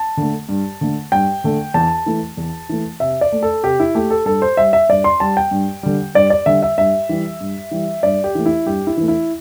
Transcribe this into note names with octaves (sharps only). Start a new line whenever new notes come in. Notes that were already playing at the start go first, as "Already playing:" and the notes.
Already playing: A5
D3 A3
G2
D3 A3
G2 G5
D3 A3
E2 A5
E3 A3
E2
E3 A3
C3 E5
D5
A3
A4
C3 G4
E4
A3 G4
A4
G2 A4
C5
G3 E5
E5
G2 D5
C6
G3 A5
G5
G2
D3 G3
G2 D5
D5
D3 G3 E5
E5
G2 E5
E3 G3
G2
E3 G3
G2 D5
G4
E3 A3
E4
G2 G4
E4
E3 A3
E4